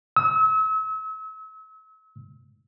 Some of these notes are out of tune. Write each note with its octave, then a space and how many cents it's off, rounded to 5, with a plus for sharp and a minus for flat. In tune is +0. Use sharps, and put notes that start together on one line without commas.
E6 -40